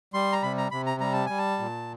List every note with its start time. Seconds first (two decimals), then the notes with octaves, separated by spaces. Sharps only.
0.14 G3 C6
0.32 A#5
0.43 C3 B5
0.58 A#5
0.71 C3 B5
0.86 A#5
1.00 G3 A#5
1.13 A5
1.26 G3 G#5
1.38 A5
1.59 A#2